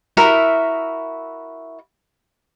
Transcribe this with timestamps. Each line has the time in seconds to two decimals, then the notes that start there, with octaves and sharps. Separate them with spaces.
0.17 E4 F#4 A#4 E5